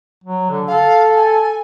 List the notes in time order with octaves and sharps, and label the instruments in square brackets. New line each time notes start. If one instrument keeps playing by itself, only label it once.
[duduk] F#3
D3
[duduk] A4 [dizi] F5
[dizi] G#5